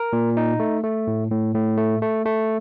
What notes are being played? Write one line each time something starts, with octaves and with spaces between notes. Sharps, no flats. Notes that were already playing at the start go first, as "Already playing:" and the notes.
Already playing: A#4
A#2
D#4
A3
A3
A2
A2
A2
A3
A3
A3